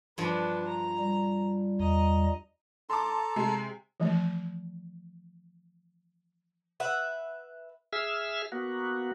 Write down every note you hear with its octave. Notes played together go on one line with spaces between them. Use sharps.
G2 F3 D4 B4
A#5
G3
E2 D#5 A#5
A4 A5 A#5 C6 D6
C3 G#3
E3 F3 A3
B4 E5 F#5
G#4 E5 E6 F6
A#3 B3 F#4